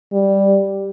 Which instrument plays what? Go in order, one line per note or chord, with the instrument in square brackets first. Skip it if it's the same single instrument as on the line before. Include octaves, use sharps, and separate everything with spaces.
[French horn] G3